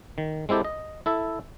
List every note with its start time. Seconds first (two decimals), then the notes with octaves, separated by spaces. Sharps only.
0.18 D#3
0.49 G#3 C4 E4 G4 A4
0.65 D#5
1.06 E4 A4 E5